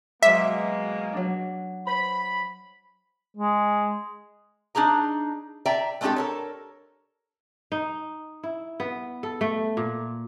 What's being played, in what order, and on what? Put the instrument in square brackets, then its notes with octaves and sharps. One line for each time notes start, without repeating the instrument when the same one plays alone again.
[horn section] B2 G#3 A#3 [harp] F#3 C6 D6 [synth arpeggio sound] E5
[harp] F#3 D4
[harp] C5 [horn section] B5
[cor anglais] G#3
[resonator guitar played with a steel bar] D4 D#4 G#4 A#5
D5 E5 G5 A#5
G#3 A3 C4 D4 G4 A4
A4 A#4 C#5
[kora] D#4
E4
B3
A4
A3
A#2